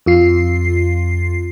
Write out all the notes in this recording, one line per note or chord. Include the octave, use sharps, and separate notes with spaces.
F2 F4 C7